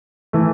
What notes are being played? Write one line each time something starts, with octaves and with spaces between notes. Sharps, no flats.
E3 A3